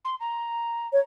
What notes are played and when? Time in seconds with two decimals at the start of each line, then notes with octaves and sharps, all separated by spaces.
0.05 C6
0.20 A#5
0.93 C#5